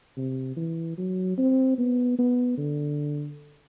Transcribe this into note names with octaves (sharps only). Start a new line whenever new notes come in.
C3
E3
F#3
C4
B3
B3
D3